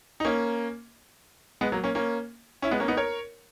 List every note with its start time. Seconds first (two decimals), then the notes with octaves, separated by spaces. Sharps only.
0.20 D#4
0.25 A#3 C#4
1.61 G#3 B3
1.72 F#3 A#3
1.84 A#3 C#4
1.95 A#3 C#4
2.62 C#4 E4
2.71 G#3 B3
2.80 A#3 C#4
2.88 B3 D#4
2.97 A#4 C#5